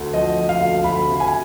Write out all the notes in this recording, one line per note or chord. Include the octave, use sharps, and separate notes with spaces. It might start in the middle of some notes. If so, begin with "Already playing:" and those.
Already playing: D2
F3 D#5
F3
F5
D2
D2 B5
C3
G#5